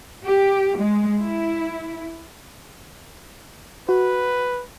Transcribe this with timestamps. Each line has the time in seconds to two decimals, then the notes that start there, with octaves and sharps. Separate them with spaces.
0.23 G4
0.77 G#3
1.20 E4
3.89 F#4 B4